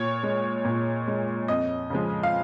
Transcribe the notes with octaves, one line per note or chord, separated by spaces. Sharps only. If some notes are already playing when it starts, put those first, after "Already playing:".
Already playing: A#2 C#5
G#3
A#2
G#3
F2 D#5
C#3 F3 G#3
F5